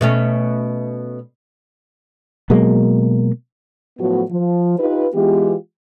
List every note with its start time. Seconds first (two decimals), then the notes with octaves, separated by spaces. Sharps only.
0.01 B2 A3 C#4
2.50 B2 F#3 G#3 A#3
3.99 A2 F3 F#3 A3 B3 F#4
4.30 F3
4.79 D#4 F4 G4 B4
5.14 E3 G#3 B3 F4 G4